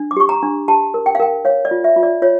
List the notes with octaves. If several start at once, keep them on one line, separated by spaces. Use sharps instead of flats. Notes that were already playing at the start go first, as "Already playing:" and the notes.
Already playing: D4
D6
G4 C#6
A#5
D4
G4 A5
A#4
G5
F5
A#4 G5
C#5 F5
D5
F4
E5
F4
D5
F4 C#5